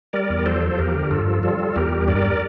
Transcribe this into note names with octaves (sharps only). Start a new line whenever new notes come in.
G3 A#4 D5
E2
F3 A4 C5
F3
E2 G4 A#4
D3
G2 F4 A4
F3
G3 F4 A4
G3
E2 G4 A#4
G3
G2 A#4 D5